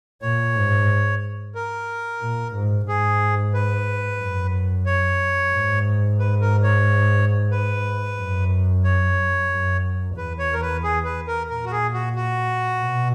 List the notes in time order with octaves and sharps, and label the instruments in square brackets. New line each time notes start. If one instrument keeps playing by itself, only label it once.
[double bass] A#2 [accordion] C#5
[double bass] G#2
[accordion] A#4
[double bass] A#2
G#2
[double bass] G#2 [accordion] G#4
[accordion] B4
[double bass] F#2
[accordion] C#5
[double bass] G#2
[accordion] B4
A#4
C#5
B4
[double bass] F#2
[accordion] C#5
[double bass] F#2
[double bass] E2 [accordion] B4
[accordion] C#5
A#4
B4
G#4
B4
A#4
[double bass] A#2 [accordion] A#4
[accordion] F#4
G#4
F#4
F#4
[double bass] B2